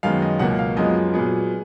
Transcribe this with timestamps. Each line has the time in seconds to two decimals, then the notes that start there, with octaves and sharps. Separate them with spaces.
0.03 F#2 D#3 G#3 B3 F5
0.22 D#5
0.39 C#2 B2 F#3 A#3 F#5
0.59 F5
0.77 F#2 F3 G#3 B3 D#5
1.14 A#2 F#3 B3 G#4